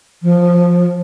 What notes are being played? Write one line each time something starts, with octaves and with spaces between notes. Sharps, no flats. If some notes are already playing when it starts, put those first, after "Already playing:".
F3